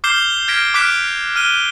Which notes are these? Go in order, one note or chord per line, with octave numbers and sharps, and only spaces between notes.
D6 F6 G6 C7 E7 G7
F6 G#6 A#6 B6 D7
D6 F6 F#6 B6 D7 E7
F6 D#7 G7